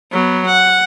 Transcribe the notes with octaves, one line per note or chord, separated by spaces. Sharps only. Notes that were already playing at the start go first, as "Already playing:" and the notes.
F#3 B3
F#5